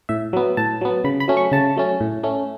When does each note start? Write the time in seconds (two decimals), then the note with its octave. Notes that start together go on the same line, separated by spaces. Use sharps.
0.09 A2 E5
0.33 F#3 B3
0.57 A2 A5
0.81 F#3 B3
1.04 C#3 B5
1.20 B5
1.28 F#3 A3 C#4
1.37 C#6
1.52 C#3 A5
1.76 F#3 A3 C#4
2.00 A2
2.24 A3 C#4